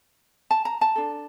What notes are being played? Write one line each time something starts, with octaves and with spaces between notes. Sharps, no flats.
A5
A#5
A5
D4 A4